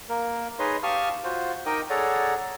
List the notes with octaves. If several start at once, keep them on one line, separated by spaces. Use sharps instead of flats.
A#3 A#4
D#4 G#4 B4 C#5 D#5 C6
G4 F5 A5 C#6 D#6 F6
F4 F#4 C5
D#4 A#4 D#5 G5 D6 D#6
G#4 A4 C#5 D5 F#5 A#5